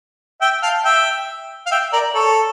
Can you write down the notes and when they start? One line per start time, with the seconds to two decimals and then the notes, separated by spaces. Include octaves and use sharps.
0.41 E5 G5
0.63 F5 A5
0.85 E5 G5
1.67 F5
1.71 E5 G5
1.93 A#4 D5
2.15 A4 C#5